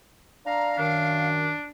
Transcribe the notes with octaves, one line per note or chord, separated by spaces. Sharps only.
D4 F5 A#5
F#2 D#3 D4